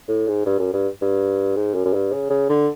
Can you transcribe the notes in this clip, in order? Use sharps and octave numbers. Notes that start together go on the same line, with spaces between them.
A2
G#2
G2
F#2
G2
G2
G#2
F#2
F#2
G2
C#3
C#3
D3